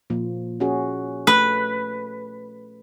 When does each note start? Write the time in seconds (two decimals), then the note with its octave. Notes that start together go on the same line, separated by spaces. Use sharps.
0.10 A#2 F3
0.60 C#4 F#4 G#4
1.27 A3 B4